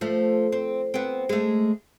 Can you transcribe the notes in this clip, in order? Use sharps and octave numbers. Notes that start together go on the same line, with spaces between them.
F3 A3
C4
B3 C4
G#3 A3